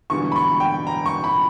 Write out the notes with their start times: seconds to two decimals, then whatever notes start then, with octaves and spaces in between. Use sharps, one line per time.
0.10 E1 E2 D3 G3 C#6
0.32 B5
0.36 C#6
0.60 G5
0.87 A#5
1.06 C#6
1.24 B5